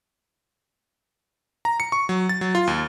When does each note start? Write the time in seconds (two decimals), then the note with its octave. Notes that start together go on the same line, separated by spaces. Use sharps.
1.65 A#5
1.80 C#7
1.92 C#6
2.09 F#3
2.29 A6
2.41 F#3
2.55 F4
2.67 D#2